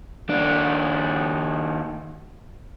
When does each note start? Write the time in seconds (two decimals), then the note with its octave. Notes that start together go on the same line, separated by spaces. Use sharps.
0.30 D#2 D4